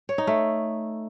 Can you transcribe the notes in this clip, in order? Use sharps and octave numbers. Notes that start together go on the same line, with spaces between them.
C#5
D#4
A3